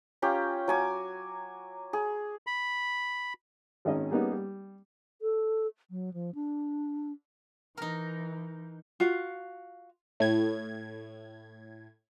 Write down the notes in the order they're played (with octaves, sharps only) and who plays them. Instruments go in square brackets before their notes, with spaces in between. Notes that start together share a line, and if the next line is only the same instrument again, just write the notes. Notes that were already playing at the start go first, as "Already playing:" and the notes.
[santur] C#4 F4 G4 A#5
F#3 G#5 D6
G#4
[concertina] B5
[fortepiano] G#1 D#3 G#3 C#4 D#5
G3 A#3 B3 C#4 D#4 G#4
G3
[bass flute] A4
F#3
F3
D4
[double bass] E3 [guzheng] D#4 A#4
[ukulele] F4 F#4 F5
[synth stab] A2 G#6